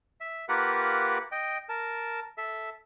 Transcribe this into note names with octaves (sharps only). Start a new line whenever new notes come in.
E5
A#3 F4 G4 A#4 B4 F#5
D#5 G5
A#4 A5
A4 E5